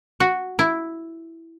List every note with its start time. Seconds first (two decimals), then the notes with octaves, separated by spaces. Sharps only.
0.20 F#4
0.59 E4